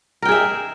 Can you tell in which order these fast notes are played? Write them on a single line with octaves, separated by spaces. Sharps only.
A#4 G5 G#4 E5